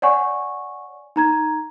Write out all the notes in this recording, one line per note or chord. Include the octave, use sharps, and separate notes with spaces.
C#5 D5 F#5 G#5 C#6
D#4 A#5 G#6